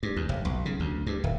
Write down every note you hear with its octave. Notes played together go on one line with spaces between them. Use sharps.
G2
D#2
F1
B1
C#3
D2
G2
D1